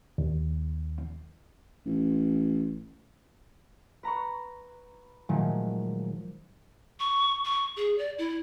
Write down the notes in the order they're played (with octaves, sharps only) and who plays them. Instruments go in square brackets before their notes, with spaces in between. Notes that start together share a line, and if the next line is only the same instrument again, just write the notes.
[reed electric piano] D#2
[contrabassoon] A1
[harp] B4 A#5 B5 C#6
A#2 D#3 F3 F#3 G#3 A3
[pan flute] C#6
C#6
G#4
D5
E4